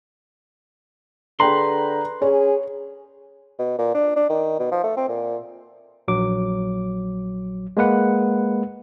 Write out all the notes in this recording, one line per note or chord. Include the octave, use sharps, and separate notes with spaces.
D3 G#4 B4 G5 A#5 C6
C#4 G#4 C#5
B2
A#2
D4
D4
D#3
B2
F3
A3
C4
A#2
A#1 F#3 D6
G#3 A#3 B4 F#5